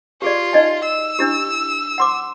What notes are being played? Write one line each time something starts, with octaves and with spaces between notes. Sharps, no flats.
F4 G4 G#4 D5
D#4 D#5 G#5
E6
D4 E4 G4
F#5 C6 D6